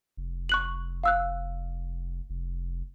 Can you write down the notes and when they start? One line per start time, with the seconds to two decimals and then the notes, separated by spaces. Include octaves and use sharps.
0.17 F1
0.49 C#6 F#6 F#7
1.04 F5 E6 F#6
2.30 F1